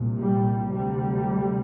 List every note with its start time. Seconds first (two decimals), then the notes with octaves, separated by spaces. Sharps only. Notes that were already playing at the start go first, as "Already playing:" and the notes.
Already playing: C2 A#2
0.19 G3
0.71 D2 C3 G3